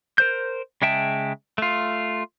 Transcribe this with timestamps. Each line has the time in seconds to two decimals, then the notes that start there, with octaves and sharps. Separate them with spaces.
0.18 A#4 C5 G6
0.82 C#3 G#3 E5 G5 A5
1.58 A3 F4